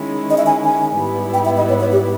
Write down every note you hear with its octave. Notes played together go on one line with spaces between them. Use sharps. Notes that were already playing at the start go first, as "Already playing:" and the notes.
Already playing: D#3 G#3 C#4 E4
D#5
E5
G#5
G#5
G#2 G3 B3 E4
G5
E5
D#5
C#5
C#5
G4